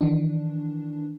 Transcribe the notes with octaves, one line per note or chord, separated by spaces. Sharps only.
D#3 E3 D4